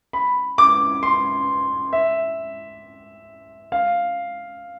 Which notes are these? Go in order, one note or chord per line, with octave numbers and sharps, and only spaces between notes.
B5
D6
C6
E5
F5